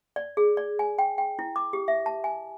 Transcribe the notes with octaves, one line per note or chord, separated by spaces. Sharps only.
D5
G#4
D5
G#5
G5
G5
E4
D6
G4
E5
A5
G#5